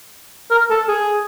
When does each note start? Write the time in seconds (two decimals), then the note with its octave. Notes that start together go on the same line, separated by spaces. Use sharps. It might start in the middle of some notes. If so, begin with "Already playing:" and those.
0.51 A#4
0.70 A4
0.88 G#4